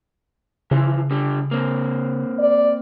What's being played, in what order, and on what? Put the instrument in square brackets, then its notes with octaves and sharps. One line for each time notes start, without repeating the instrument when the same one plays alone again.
[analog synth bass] C#3 [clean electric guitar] E3 F3
[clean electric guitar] D3 G3
A#3 C4
[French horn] D5